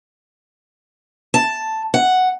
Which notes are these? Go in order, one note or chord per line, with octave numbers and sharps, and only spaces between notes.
A5
F#5